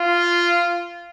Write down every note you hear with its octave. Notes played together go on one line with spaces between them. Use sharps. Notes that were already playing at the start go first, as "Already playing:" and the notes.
Already playing: F4